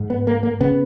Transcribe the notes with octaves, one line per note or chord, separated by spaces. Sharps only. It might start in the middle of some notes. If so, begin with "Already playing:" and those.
Already playing: G#2
B3
A#3
A#3
C#3 B3